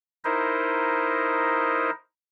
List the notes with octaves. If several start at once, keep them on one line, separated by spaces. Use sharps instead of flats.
D#4 E4 A#4 C5 D#5